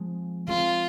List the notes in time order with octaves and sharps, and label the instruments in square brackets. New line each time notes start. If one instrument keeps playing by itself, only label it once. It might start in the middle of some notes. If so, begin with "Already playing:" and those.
Already playing: [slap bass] F3 G#3 C4
[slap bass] F3 G#3 C4 [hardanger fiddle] F4